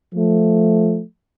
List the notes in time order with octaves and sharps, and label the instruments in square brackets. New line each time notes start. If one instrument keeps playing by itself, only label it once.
[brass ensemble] F3 A3